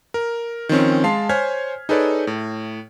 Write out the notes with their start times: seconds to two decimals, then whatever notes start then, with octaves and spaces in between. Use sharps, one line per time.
0.14 A#4
0.69 D#3 F3 C4 C#4
1.04 G#3 F5 A5 C6 C7
1.29 C5 C#5 G#5 F6 G#6 B6
1.89 D#4 G#4 A4 B4 C#5 D5
2.27 A2